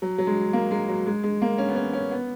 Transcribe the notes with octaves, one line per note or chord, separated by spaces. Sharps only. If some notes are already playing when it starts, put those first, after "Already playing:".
F#3
F#3
G#3
A#3
G#3
F#3
G#3
G#3
A#3
C#4
B3
C#4
C#4
B3